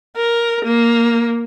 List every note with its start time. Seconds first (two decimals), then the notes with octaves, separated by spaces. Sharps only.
0.17 A#4
0.65 A#3